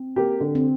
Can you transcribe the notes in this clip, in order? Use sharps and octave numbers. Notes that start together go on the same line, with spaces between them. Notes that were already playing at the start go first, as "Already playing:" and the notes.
Already playing: C4
A#3 G4
D3
C4